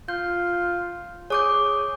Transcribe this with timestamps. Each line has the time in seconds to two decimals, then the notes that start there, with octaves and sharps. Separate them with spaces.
0.08 F4 G6
1.30 G#4 C#5 D6 G6